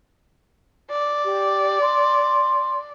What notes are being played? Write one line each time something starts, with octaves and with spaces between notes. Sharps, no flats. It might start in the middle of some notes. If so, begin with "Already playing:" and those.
D5
G4
C6